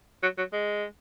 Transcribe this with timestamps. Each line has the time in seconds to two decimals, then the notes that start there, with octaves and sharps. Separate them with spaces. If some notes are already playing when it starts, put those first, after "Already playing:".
0.23 F#3
0.38 F#3
0.53 G#3